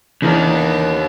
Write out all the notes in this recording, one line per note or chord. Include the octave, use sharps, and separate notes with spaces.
D#2 C#3 E3 B3 D4 A#4